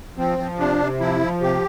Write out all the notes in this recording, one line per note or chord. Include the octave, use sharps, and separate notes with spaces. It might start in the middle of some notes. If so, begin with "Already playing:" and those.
F3 C4
F3
C3 D4
C3
F3 E4
F3
C3 G4